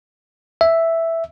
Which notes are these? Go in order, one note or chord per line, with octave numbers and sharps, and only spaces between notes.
E5